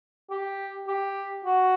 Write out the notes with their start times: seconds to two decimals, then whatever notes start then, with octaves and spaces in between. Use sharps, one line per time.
0.30 G4
0.87 G4
1.45 F#4